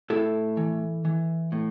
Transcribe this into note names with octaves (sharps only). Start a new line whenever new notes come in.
A2 E4 A4
E3
E3
A2